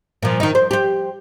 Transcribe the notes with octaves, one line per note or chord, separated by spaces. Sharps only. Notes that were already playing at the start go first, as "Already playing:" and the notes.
A#2 F3
D#3 D#4
C5
G4 C5